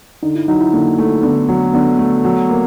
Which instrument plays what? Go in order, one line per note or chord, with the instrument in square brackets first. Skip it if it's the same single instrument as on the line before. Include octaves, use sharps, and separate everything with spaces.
[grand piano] D3 [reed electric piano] D#4
[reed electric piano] E4
[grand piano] F#3 [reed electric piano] D#4
[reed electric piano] E4
[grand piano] D3 [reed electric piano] A#3
[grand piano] A3
[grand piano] D3 [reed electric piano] B3
[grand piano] F#3
[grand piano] D3 [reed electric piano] B3
[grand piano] A3
F#3
A#3